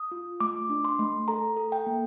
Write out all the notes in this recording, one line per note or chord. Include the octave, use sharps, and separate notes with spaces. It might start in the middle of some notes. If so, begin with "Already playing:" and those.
Already playing: D#6
F4
A3 D6
D4
C6
A3
A4 A#5
A4
G5
A#3